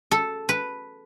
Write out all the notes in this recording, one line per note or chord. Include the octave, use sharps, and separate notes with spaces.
A4
B4